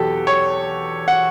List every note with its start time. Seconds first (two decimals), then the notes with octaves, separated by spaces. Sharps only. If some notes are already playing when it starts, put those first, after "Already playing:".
Already playing: E2 B2 F#3 G4 A4
0.27 C#5
1.08 F#5